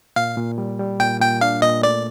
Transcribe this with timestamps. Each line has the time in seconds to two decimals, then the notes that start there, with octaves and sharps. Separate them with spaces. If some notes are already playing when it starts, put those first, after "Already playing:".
0.16 A#2 F5
0.37 A#2
0.58 G3
0.79 G3
1.00 A#2 G5
1.20 A#2 G5
1.41 D4 F5
1.62 A#2 D#5
1.83 A3 D5